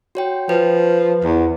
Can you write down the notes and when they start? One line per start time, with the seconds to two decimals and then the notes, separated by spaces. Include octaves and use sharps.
0.15 F#4 C#5 G5
0.49 F3 B4
1.24 E2